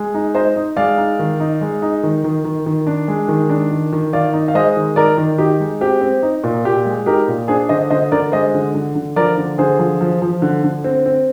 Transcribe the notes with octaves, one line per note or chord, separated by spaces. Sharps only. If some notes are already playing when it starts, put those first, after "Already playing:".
Already playing: G#3
D#4
D#4 C5 D#5
D#4
G#3 D5 F5
D#4
D#3
D#4
G#3
D#4
D#3
D#3
D#3
D#3
D4
G#3
D#3
D4
D#3
D#3
D#3 D5 F5
D#4
F5
G#3 C5 D#5
D#3
D#4 A#4 D5
D#3
D#4 G4
G#3
C4 G4
C4
D#4
A#2
A#2 G4
G#3
D#4 G4 A#4
A#2
D4 G#4 C5
D3 C5 D#5
D3 C5 D#5
D3 A#4 D5
G#3 C5 D#5
D3
D3
D3
F3 A#4 D5
D3
D3 G#4 C5
F3
F3
F3
D3
D3
C4
C4